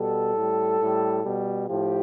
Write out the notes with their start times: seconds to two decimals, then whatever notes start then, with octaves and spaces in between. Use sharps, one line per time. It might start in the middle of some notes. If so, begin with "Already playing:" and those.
Already playing: B2 G3 A4
0.35 A2 G3
0.79 A2 G3
1.24 B2 G3
1.67 A2 F3 G4